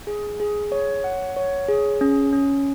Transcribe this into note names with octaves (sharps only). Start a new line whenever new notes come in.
G#4
G#4
C#5
F#5
C#5
G#4
C#4
C#4